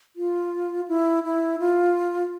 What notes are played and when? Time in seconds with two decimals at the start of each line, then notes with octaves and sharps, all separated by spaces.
0.16 F4
0.88 E4
1.24 E4
1.59 F4